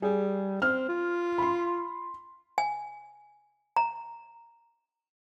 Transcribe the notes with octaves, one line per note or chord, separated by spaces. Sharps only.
G3 G#4
C4 F6
F4
B5 C6
G#5
A#5